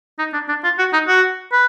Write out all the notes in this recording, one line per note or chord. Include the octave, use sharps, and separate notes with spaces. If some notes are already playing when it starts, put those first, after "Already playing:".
D#4
D4
D4
F4
F#4
D#4
F#4
B4